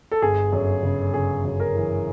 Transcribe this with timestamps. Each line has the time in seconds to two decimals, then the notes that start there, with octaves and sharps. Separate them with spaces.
0.11 A4
0.22 G1 G#4
0.53 F#2
0.83 C#3
1.14 C#3 G#4
1.45 F#2
1.60 A#4
1.75 E3